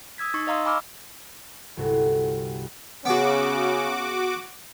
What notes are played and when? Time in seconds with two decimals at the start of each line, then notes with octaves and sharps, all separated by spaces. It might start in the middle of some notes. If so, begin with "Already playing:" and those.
0.18 D#6 E6 G#6 B6
0.34 D#4 C#6
0.47 D#5 F5 A#5 C6 D#6 E6
0.65 G#5 B5 C#6 D6 E6 F6
1.77 G1 C2 A3 C4 F#4
3.05 C#3 B3 C#4 F#4 G#4 D6